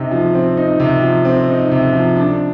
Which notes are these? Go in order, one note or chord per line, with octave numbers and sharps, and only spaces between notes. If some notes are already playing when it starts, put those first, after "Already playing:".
Already playing: C3 D#4
F3
C4
D#4
C3
F3
C4
D#4
C3
F3
D4